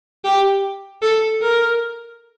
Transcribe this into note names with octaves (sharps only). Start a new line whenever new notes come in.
G4
A4
A#4